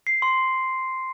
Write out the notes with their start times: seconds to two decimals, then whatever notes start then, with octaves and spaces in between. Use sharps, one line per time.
0.07 C7
0.22 C6